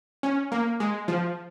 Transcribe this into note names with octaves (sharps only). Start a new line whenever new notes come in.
C#4
A#3
G#3
F3